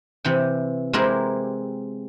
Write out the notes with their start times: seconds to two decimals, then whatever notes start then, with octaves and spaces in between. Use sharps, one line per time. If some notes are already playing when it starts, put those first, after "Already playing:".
0.25 C3 E3 G5
0.93 G#3 C4 E4 G4 A#4